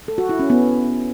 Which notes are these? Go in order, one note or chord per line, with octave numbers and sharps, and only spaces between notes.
A4
F#4
E4
C#4
B3